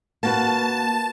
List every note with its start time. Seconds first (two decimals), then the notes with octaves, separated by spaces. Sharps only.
0.23 A#3 F#4 B4 A5